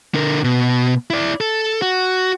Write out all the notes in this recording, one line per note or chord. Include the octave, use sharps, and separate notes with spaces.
D3 A#4
B2
E4 D5
A4
F#4